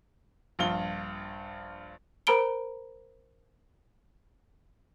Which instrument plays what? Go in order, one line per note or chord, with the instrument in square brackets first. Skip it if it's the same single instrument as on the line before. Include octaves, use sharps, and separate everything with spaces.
[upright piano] A#1 G2 F4 G7
[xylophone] A#4 C5 A#5 B5 D7 G7